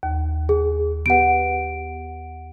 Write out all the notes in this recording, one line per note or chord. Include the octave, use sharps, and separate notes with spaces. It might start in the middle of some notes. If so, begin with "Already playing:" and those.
D#2
G#4
B3 G4 B4 F#5 D7